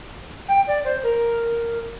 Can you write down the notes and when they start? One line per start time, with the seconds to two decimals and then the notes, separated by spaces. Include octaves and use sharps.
0.48 G5
0.67 D5
0.85 C5
1.03 A#4